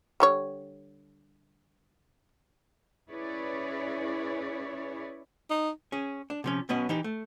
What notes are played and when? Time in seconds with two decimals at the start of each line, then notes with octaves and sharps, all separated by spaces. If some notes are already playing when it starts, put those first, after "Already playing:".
0.20 D3 G3 C#5
3.10 C#4 E4 G#4 B4 C#5 D5
5.50 D#4
5.92 C#4 G#4
6.30 D4
6.44 C3 F3 C#4
6.69 B1 B2 B3 C#4 D#5
6.89 E3 D#4 G4
7.04 A3